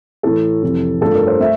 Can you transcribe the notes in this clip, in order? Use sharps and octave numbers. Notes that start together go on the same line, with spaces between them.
A2 E3 A3 A4
F2 C3 E3
G2 F3 A3 A4
A#4
C5
A3 E5